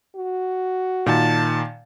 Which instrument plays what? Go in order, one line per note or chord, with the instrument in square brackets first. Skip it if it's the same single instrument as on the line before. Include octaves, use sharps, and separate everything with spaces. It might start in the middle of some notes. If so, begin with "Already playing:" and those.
[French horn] F#4
[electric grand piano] A#2 D#3 [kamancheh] A5